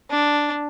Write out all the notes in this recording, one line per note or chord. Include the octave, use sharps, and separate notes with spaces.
D4